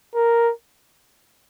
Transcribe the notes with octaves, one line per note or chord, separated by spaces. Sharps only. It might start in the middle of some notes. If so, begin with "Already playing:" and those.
A#4